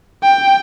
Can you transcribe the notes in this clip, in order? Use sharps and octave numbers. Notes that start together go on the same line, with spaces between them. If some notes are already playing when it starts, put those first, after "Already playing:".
G5